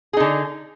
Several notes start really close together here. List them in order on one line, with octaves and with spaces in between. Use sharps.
G#4 D#4 D3